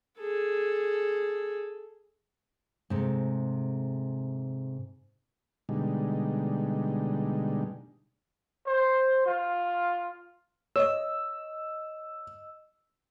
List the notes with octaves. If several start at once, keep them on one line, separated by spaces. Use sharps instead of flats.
G#4 A4
G#2 C3 A3
B2 D3 G3 G#3 D#4
C5
F4
C#5 D#5 E6